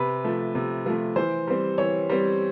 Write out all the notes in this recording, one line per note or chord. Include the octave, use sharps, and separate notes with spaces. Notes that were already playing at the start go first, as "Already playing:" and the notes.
Already playing: C3 B4
F3 A3
C3
F3 A3
E3 C5
G3 C4
E3 C#5
G3 C4